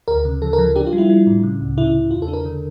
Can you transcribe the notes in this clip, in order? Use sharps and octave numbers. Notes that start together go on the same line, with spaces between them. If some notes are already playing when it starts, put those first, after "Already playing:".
D2 A#4
C#3
F3 A4
A#4
F3
D4 G4
F4
G3
E4
G3
A2
C#3
C#2
C#3 E4
C#3
E2 F4
A4
D4
A#4
D3